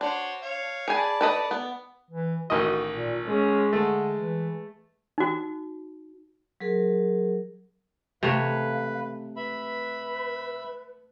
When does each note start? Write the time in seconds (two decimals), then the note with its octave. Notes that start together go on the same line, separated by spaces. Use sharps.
0.01 D4 F#4 C5 C#5
0.42 C#5 F5
0.88 G#4 D5 G#5 A5 B5
1.21 A4 B4 D#5
1.51 B3
2.11 E3
2.50 A1 D#3 F#4 D#5
2.94 A#2
3.26 G#3 C#4
3.73 D3 A3
4.16 E3
5.18 D#4 F#4
6.60 F#3 G#4 A#4
8.23 C3 A3 B4 C#5 F5
9.36 B4 E5 B5